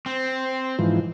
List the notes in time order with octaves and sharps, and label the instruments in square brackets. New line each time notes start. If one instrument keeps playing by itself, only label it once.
[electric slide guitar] C4
[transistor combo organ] G#2 E3 F3